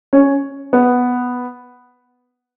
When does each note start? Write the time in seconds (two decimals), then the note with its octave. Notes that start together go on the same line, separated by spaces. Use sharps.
0.13 C#4
0.73 B3